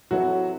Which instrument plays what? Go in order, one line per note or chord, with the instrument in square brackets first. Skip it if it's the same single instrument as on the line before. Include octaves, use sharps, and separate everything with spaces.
[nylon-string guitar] C3 E3 B3 E4 A4 [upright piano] F#3 F#4